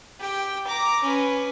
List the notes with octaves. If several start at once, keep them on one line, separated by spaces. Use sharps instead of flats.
G4 G5
A#5 D6
C#4 B4